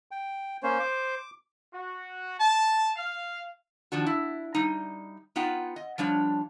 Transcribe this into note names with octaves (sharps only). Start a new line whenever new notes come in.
G5
A#3 C#4 C5 C#5
D6
F#4
A5
F5
D#3 F3 D4 F#4
E4
G3 D#4
B3 D#4 F4 F#5 G5
D#5
F3 G3 D4 C#5